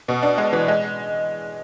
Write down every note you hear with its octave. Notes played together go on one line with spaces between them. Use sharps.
B2
D4
G#3
E3
G#3